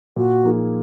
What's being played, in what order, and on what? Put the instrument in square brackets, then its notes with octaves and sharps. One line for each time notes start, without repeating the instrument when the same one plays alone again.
[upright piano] A#2 [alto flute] F#4
[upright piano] F3 A#3 D#4 G#4